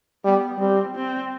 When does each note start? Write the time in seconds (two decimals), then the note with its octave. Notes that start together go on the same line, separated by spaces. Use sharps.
0.25 G3 B3
0.59 G3 C4
0.95 C4